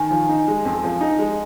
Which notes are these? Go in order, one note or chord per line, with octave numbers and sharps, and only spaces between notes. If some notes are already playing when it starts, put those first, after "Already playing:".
Already playing: D#3 G#5
F3
D#4
G#3
F2
F3
D#4
G#3